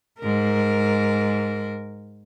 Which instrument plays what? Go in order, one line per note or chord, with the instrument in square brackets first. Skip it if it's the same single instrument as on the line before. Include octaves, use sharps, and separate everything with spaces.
[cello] G#2 A#4